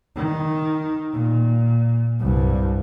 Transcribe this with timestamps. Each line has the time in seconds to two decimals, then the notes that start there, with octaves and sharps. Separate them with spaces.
0.16 D#3
1.13 A#2
2.20 C2 G2